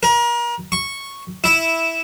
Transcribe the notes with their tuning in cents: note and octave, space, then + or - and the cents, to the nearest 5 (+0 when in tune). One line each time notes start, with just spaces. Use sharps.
A#4 +35
C#6 -5
E4 -5